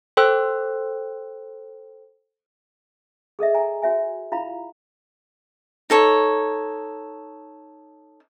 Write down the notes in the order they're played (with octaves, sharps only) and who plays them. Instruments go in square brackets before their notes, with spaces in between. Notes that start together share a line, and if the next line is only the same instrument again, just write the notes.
[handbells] A4 C5 G5 C6 E6 F#6
[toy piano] G#4 A4 D#5 E5
G#5 A#5
F#4 C#5 E5 G#5
E4 F4 F5 A#5 B5
[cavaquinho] D#4 A4 C#5